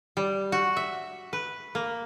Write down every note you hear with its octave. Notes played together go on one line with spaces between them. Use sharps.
G3
F#4
E5
B4
A#3